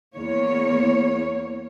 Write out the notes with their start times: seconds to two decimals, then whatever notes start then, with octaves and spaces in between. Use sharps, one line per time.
0.15 E2 A#3 C#5